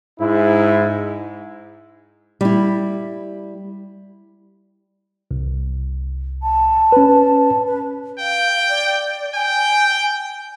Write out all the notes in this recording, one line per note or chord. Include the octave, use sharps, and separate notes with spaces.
G#2 E4
G3 E4
C2
A5
C#4 B4
B4
F5 G5
D5
G5 G#5